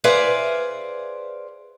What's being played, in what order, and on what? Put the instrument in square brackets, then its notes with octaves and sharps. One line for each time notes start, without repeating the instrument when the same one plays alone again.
[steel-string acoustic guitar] G#4 B4 C5 D5 E5 F5